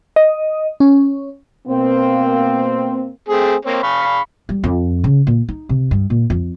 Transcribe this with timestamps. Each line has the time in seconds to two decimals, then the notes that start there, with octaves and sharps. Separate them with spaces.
0.16 D#5
0.80 C#4
1.68 B2 A#3 C4
3.29 A3 C4 G#4
3.65 A#3 C4 C#5
3.83 F5 B5 C#6
4.49 G3
4.64 F2
5.04 C#3
5.27 A#2
5.49 D#4
5.69 C3
5.91 G2
6.10 A#2
6.30 F2